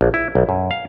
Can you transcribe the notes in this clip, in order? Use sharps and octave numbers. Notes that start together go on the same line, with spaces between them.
A#1
E4
B1
F#2
F5